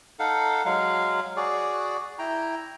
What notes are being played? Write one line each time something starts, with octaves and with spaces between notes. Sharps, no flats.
D#4 A4 F5 F#5
F#3 G#3 F5
F#4 G#4 D5
E4 G5 A#5